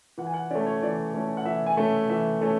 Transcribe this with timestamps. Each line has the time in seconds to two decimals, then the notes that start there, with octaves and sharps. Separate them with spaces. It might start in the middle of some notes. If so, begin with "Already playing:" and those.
0.18 E3 F#5
0.27 G#5
0.34 F#5
0.50 A3 C#4 D5
0.66 C#5
0.82 E3 D5
1.14 A3 C#4
1.37 F#5
1.45 E3 E5
1.66 G#5
1.77 A3 C#4
2.09 E3 E5
2.41 A3 C#4